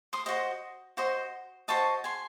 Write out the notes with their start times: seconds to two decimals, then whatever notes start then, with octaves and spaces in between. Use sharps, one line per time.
0.13 C6 D#6
0.26 F#4 C5 D#5
0.97 F#4 C5 D#5
1.68 F#4 C5 D#5 A5 C#6
2.04 G#5 C6